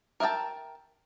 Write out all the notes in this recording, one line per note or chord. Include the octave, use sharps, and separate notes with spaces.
A#4 E5 F5 G5 A5